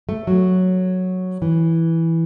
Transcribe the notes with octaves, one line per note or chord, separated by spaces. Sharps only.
A3
F#3
E3